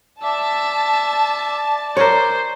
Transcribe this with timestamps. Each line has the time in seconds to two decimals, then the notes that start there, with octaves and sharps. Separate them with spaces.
0.24 D5 E5 A5
1.97 A#4 C5 C#5